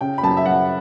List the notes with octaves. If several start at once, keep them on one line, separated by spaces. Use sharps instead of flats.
C#3 G5
B5
F#2 A5
E5
F#2 F#5